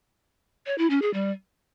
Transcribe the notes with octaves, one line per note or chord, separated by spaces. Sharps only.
C#5
E4
C#4
G#4
G3